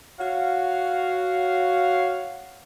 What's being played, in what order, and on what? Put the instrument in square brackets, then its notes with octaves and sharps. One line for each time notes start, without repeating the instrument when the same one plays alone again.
[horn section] F#4 C#5 F5